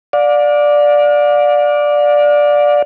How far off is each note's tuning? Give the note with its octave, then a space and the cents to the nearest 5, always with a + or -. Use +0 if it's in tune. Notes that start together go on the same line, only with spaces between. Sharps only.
D5 +0 F5 +45